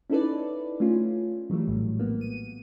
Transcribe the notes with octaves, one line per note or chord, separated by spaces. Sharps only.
C#4 D#4 E4 A4 B4 D5
A3 C#4 F4
E3 F#3 G3 A3
A#1 A2
A#3 B3
D#7